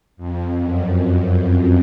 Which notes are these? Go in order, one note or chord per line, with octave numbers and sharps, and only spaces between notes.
F2
F#2
F#2
F#2